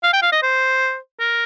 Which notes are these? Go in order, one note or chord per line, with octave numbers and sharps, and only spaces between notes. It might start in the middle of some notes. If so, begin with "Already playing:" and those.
F5
G5
F5
D#5
C5
A#4